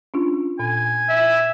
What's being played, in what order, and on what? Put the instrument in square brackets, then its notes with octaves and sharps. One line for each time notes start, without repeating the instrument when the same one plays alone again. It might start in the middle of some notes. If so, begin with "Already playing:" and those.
[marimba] C#4 D4 F4
[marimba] A#2 [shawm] G#5
[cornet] E5